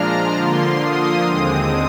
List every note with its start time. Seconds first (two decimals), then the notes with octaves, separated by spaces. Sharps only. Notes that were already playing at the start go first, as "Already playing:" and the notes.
Already playing: A#2 F3 G#3 D4 F4 A#5 F6
0.34 D3 F3 A#3 F4 C6
0.80 D#6
1.27 D#2 D3 G#3 C4 D#6